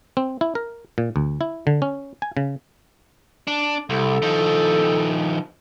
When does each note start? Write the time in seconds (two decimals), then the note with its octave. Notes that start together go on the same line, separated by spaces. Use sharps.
0.17 C4
0.41 E4
0.55 A#4
0.98 A#2
1.16 D2
1.41 E4
1.67 D3
1.82 C#4
2.22 G#5
2.37 C#3
3.47 D4
3.90 C2 A4
4.22 D#3 F3